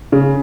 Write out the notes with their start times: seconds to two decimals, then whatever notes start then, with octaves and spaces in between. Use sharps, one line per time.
0.12 C#3